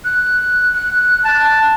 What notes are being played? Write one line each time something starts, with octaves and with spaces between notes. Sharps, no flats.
F#6
F#6
A5